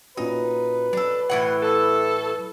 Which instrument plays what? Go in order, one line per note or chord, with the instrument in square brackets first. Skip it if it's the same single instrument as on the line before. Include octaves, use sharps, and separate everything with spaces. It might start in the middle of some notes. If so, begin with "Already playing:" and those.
[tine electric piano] A#2 C#4 F#4 [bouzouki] D#4 [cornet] B4
[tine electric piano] F#3 [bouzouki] D4 A4
[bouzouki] A2 E3 F#5
[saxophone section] A4